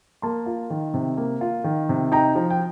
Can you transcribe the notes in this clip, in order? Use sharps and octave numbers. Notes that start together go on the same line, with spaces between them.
A#3 A5 C6
F4
D#3
C3
A#3
F4
D#3
C3
D#4 G5 A#5
F3
G5